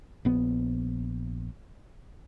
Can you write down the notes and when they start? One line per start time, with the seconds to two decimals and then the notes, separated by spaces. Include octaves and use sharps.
0.25 A#1 B3